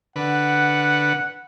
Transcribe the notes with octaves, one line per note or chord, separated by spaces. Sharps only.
D3 B4 F#5